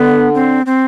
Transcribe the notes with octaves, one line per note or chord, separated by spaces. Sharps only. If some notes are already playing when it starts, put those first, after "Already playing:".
Already playing: D3 B3
C4
C4